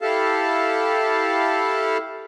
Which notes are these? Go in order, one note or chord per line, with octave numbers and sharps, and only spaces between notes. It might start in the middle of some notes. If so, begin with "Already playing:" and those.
E4 G4 A4 F5 A5